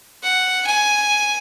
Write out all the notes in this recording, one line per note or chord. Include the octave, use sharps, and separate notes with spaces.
F#5
G#5